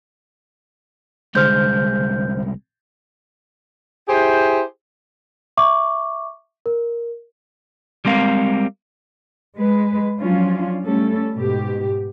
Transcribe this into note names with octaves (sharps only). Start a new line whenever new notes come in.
C2 D3 G#3 C5 F6 G6
E4 G4 G#4 C5
E5 C#6 D6
A#4
G3 G#3 C4 A#4 F5
G#3 B4
F3 F#3 C#4 D4 F4
G3 A3 C#4 A4
G#2 B2 G4